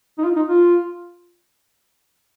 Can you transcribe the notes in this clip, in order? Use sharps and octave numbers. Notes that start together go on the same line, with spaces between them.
D#4
F4
D#4
F4